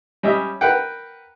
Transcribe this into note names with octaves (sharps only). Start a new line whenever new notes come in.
G3 C#4 D#5 E5
A#4 B4 F#5 G5